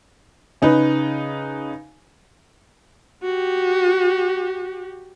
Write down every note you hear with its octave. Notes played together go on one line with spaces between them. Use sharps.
C#3 D#4 B4
F#4 G4